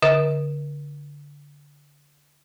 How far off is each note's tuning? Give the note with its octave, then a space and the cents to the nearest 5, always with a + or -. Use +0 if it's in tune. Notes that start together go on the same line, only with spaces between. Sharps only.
D3 -20 A#4 +35 D#5 +45